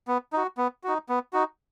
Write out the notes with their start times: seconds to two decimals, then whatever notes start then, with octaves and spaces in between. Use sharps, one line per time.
0.08 B3
0.33 D#4 F#4
0.58 B3
0.84 D#4 F#4
1.09 B3
1.33 D#4 F#4